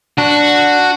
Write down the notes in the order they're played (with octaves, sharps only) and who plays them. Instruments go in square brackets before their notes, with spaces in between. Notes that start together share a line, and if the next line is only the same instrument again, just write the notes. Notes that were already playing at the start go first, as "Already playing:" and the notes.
[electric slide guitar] D4 [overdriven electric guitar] F#4